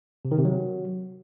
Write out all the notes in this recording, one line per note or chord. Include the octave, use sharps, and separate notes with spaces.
C3
D#3
C3
F#3